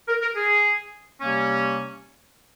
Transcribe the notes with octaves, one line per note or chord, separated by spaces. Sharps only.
A#4
A#4
G#4
C3 G3 A#3 C#4